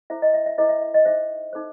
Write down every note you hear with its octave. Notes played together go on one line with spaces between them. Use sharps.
E4 A4 C5 E5
D#5
E5
E5
E4 A4 C5 D#5
E5
E5
D#5
D#4 A4 C5 E5
D#4 A4 C5